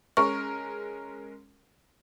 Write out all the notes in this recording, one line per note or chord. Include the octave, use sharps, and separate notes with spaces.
G#3 C#4 A#4 C#6